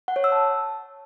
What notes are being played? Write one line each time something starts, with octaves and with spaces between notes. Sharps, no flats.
F#5
C#5
E6
A5